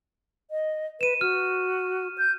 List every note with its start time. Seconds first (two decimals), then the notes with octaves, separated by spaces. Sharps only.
0.51 D#5
1.01 B4 D#7 E7
1.21 F#4 F6
2.18 G6